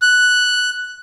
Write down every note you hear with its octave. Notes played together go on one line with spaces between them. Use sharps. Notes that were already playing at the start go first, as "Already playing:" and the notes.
F#6